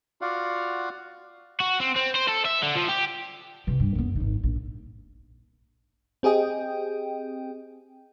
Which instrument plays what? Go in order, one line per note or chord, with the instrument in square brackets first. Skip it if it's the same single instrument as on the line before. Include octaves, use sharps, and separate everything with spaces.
[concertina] F4 F#4 D5 F5 F#5
[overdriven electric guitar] F#4
C4
C4
C5
A4
E5
D3
F3
G4
[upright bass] C3 E3
G2
F#2 B3
G#1 D#4
A#1
[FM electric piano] C4 G4 G#4 D#5 G5